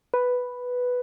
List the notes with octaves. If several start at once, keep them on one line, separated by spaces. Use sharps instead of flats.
B4